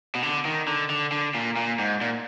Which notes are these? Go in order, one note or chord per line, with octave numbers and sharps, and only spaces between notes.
B2
D3
D#3
D3
D3
D3
A#2
A#2
G#2
A#2